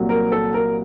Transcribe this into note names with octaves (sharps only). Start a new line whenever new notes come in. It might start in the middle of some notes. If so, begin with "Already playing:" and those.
Already playing: C2 A#2 F#3
A#4
A4
A#4